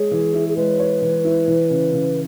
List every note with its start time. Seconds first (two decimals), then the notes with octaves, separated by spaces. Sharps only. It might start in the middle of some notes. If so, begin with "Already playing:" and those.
Already playing: G#3 G#4 C#5
0.11 E3
0.34 E4
0.49 G#4
0.57 G#3 B4
0.79 C#5
1.02 E3
1.25 E4
1.48 E3
1.70 C#3
1.93 C#3